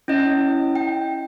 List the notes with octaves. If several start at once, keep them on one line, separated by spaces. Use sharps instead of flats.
C#4 E4 D#5
G5